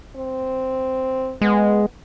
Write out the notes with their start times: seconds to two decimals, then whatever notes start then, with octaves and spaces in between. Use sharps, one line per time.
0.16 C4
1.41 G#3 B3